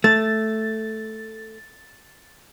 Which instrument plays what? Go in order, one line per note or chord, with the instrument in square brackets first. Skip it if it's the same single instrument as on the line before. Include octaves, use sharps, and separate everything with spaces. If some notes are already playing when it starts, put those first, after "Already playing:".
[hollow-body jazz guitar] A3 [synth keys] A6